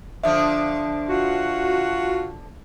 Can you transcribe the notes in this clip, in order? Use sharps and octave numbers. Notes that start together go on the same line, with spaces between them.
D3 F3 D4 E5
F4 F#4